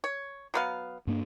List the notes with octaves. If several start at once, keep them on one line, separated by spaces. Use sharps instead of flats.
C#5
F#3 B3 F5
G2 A#3 D4